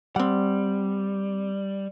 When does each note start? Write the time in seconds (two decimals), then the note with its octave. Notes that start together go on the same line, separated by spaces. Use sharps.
0.16 G3 C4 F#5